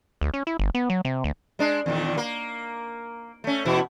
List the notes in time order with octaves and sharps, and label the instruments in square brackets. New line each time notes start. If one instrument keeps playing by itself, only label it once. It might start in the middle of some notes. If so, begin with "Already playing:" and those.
[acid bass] D2
C#4
E4
G1
B3
F#3
C3
D2
[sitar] G#3 D4
E2 A#2 D#3
A#3
A3 C#4
E2 B2 E4